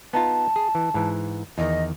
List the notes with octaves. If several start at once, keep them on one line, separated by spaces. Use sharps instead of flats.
B3 D#4 F4 A5
G#4
E3
G#2 E3
E2 D#3 D#5